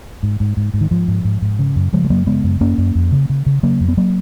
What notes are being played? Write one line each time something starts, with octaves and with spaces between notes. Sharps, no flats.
G#2
G#2
G#2
G#2
D#3
G#2 F3
G#2
G#2
G#2
C#3
F#2
C#3 F3 G#3
G#3
F#2 F#3 A#3
C#3 G#3 B3
F#2
F#2 A#3 C#4
F#2
F2
C#3
C#3
C#3
C#3 F#3 A#3
F2
B3
F#3 A#3